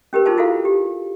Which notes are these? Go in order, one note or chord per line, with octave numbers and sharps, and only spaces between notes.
C#4 G4 A#4 B4
D#4 F4 G#4 C5 A5
E4 F#4 A4 C5 F5
G4